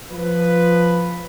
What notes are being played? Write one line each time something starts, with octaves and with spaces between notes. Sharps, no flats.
F3 B4